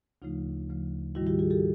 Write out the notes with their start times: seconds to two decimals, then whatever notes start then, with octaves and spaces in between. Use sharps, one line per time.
0.22 D2 C#3 F3 A3 D#4 F4
0.69 D2 C#3 F3 A3
1.15 G#2 D#3 G3 E4 F#4
1.27 F4 G4
1.39 F#4 G#4
1.50 G4 A4